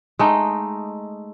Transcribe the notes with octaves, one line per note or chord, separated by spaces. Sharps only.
G#3 A3 D#4